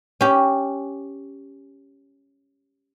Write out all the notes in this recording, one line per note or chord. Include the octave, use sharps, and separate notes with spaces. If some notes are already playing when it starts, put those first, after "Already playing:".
C#4 G4